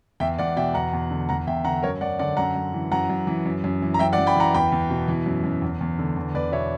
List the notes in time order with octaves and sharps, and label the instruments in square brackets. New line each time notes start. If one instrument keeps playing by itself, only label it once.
[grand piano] E2 E5 G5
E2 D5 F#5
B2 E5 G5
E2 F#5 A#5
E2
D3
E2 F#5 A#5
E2 E5 G5
D3 F#5 A#5
F#2 A#4 C#5
F#2 D5 F#5
D3 D5 F#5
F#2 F#5 A#5
F#2
E3
F#2 F#5 A#5
F#2
E3
F#2
F#2
E3
A#5
F#2 E5 G5
D5 F#5
F#2
G5 B5
E3 F#5 A#5
E2 G5 B5
E2
B2
E3
F#2
F#2
E2
E2
D3
E2
E2 B4 D5
B2 C#5 E5